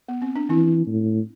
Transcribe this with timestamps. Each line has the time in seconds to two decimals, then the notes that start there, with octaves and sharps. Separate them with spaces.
0.09 B3
0.22 C4
0.36 D4
0.49 E3 C4 E4
0.87 A2